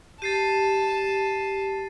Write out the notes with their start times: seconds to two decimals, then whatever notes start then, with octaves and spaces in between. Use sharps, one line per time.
0.22 G4 A5 A6 C7 D#7